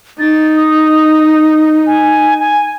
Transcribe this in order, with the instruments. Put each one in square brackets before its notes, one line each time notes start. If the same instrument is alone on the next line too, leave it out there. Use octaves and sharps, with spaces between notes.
[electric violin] D#4 [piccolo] A6
[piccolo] D#6
G#5
G#5